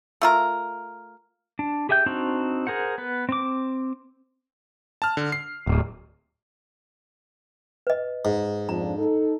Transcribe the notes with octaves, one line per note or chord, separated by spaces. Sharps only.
A3 F4 A#4
D4
G4 G#4 E5 G5 G6
C4 D4 D#4 F#4
G#4 A#4 C5 F#5
B3 B4
C4 D6
A5 F6
D3
C7
D1
B4 D#5
G#2
F2 F3 D4 A#5
D#4 A4